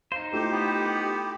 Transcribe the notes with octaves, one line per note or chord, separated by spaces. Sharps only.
D#4 C5 F5
A3 E4 F4 G4
B3